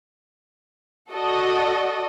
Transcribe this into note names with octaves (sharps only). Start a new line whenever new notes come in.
F#4 A4 D5 D#5